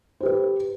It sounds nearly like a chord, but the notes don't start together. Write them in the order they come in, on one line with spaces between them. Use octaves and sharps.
C5 G4 B4